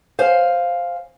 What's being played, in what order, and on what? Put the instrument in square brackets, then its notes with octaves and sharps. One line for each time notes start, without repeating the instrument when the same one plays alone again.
[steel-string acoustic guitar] C5 F5 G#5